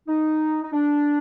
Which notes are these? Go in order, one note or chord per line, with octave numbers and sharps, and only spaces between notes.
D#4
D#4
D4